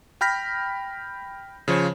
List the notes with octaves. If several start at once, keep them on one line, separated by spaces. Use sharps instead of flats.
G5 B5 F6 G6 A#6 B6
C#3 F3 C5 C#5